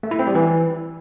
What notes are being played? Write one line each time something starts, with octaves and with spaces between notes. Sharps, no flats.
A3
E4
C4
G3
E3